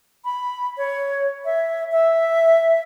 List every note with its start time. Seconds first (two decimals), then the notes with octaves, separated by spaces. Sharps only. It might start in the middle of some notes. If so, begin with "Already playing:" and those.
0.24 B5
0.77 C#5
1.45 E5
1.92 E5